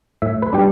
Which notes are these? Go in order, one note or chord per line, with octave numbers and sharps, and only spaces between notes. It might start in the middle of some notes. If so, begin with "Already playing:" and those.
A2 E5
B4
G3 D4 G4